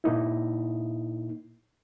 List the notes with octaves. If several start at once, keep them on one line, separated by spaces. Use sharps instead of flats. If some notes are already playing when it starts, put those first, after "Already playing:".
A#2 A#3 D#4 E4